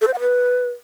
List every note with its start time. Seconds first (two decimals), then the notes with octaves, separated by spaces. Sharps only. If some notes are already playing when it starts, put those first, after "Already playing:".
0.01 A4
0.08 C5
0.14 F#5
0.20 B4